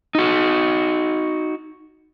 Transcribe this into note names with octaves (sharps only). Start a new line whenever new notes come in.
D#4 F#4